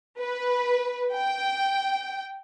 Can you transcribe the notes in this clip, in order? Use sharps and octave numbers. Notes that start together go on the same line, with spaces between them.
B4
G5